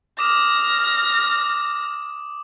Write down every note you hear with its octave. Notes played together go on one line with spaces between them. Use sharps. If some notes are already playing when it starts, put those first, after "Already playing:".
D6 D#6 F6 A#6 E7